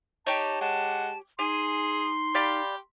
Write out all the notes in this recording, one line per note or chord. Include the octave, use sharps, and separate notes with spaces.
D#4 G4 C#5 A5
G#3 F#5 A5
D#4 G#4 G#5 C6
G4 D5 F5 B5